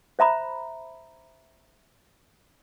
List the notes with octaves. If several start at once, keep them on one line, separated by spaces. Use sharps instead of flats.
C5 E5 A#5 B5